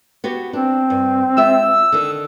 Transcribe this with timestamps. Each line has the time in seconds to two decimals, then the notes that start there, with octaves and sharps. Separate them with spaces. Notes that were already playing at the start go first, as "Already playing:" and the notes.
0.24 B3 F#4 G4
0.53 C4 D4
0.90 G2
1.37 G#3 F4 E5 E6
1.92 D3 D#3